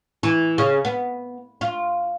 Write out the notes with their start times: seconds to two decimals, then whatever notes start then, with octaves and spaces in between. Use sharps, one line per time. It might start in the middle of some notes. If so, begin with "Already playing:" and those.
0.23 E3
0.58 C#3
0.85 B3
1.61 F4